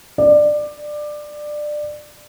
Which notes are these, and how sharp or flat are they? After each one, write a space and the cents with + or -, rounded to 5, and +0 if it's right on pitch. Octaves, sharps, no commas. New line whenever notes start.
D5 +20